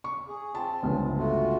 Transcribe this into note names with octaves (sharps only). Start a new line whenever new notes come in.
C#6
G#4
C4 F4 A5
G1 C#2
A3 F4 F#4